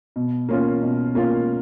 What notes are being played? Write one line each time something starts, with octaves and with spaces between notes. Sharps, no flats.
B2
A#3 C#4 F4
B2
A#3 C#4 F4